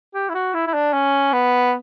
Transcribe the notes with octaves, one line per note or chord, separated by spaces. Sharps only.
G4
E4
F#4
E4
E4
D4
C#4
B3